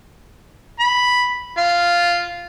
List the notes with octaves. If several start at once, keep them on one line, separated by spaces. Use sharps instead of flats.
B5
F4